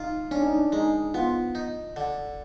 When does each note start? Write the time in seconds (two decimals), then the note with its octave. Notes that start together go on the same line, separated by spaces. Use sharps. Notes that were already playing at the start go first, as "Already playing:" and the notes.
Already playing: D#4 F4
0.31 C#4 D4
0.42 D#4
0.53 D4
0.72 G#3 D#4
1.14 B3 F4
1.55 D#4
1.96 D3